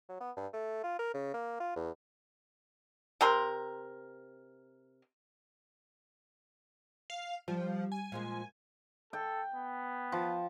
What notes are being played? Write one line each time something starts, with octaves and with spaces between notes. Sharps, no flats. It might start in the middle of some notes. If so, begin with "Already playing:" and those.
F#3
B3
G2
A3
F4
A#4
C#3
A#3
F4
E2
C3 A#4 C6
F5
F3 G3
G#5
A#2 F3 G#3
A4 G5
B3
F3